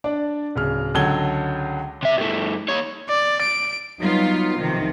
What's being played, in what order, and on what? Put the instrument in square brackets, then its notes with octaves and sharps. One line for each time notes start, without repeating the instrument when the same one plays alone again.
[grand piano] D4 D5
D1 C#3 F6
C#2 D3 F#3 A5 G#6 G7
[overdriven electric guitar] C3 E5
G2 A3
D#2 C#5
[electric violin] D5
D7
[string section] F#3 G3 B3 D#4 F4
B1 C3 D#3 F3